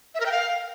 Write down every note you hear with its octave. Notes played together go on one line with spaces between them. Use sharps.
E5
A#4
G5
F5